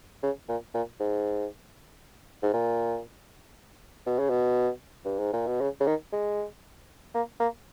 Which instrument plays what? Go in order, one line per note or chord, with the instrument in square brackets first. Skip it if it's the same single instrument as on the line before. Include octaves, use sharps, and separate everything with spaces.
[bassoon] C#3
A#2
A#2
G#2
G#2
A#2
B2
C#3
B2
G2
G#2
A#2
B2
C#3
C#3
D#3
G#3
A#3
A#3